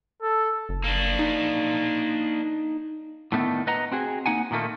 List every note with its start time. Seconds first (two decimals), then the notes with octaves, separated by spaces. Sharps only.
0.22 A4
0.69 F#1
0.84 A#3 D4
1.19 D#4
3.32 A2 D3 D#3 A3 B3
3.67 B4 D#5 F#5 A#5
3.92 C4 F#4 G#4
4.26 A#3 D#4 F#5 G#5
4.51 A#2 D#3 A3 A#3